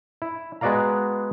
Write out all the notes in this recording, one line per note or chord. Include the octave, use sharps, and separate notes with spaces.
E4
G#3 B3 F#4 D5 F5 A#5